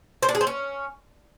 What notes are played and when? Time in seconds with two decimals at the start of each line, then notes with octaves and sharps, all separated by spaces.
0.23 C5
0.29 D4
0.35 G#4
0.41 C4
0.47 C#4